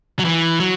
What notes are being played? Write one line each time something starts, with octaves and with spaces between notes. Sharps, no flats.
F#3
E3
F#3